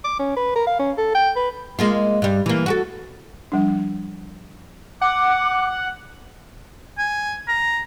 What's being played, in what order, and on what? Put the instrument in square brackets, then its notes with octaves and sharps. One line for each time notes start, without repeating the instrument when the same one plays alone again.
[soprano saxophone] D6
C#4
B4
A#4
F5
C#4
A4
G5
B4
[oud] G#3 A#3 F4
G2 G3
E3 A#3
F#4 G4 A4
[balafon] F3 G3 D4
[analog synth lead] F#5 [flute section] D6 F#6
[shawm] G#5
A#5